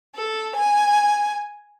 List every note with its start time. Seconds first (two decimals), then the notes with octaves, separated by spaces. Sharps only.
0.15 A4
0.54 G#5